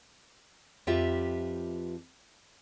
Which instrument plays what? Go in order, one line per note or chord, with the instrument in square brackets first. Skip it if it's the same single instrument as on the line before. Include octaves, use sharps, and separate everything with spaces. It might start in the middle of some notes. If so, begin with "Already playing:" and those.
[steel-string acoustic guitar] F2 F4 G4 B4 E5